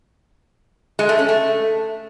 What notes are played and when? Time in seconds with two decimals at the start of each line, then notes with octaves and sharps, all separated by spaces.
0.99 G#3
1.09 A3
1.19 C#4
1.29 A3